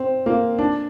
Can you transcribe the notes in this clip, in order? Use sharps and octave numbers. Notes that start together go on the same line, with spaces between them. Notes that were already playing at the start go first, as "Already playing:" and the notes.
Already playing: C4
A#3
D4